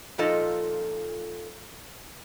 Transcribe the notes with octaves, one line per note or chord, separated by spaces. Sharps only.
A#2 F3 D#4 F4 A4 D#5